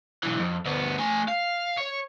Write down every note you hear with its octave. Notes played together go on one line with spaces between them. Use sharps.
B1 E3
F2
D2 B3
A3 G#5
F5
C#5